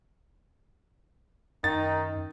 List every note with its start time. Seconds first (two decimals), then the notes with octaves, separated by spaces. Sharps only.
1.64 F#2 D#3 D#4 A6